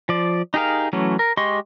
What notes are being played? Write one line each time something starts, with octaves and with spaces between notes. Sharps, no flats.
F3 D5
D#4 G4 G#4 A#4 F5
E3 F#3 A3 C#4
A#4
G#3 G4 D#5 C6 C#6